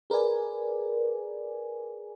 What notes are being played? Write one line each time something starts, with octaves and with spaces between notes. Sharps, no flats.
G#4 A#4 B4 D5 G#5